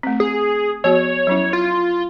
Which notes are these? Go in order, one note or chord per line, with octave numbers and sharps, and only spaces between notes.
A3 C4
G#4
F3 B3 F#4 C#5
F#3 C#4 E4
F4